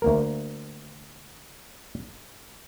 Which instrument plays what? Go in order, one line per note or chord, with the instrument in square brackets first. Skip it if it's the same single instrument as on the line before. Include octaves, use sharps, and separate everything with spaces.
[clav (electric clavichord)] D2 A#3 A#4